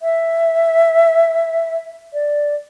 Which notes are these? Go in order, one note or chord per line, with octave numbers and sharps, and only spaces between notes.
E5
D5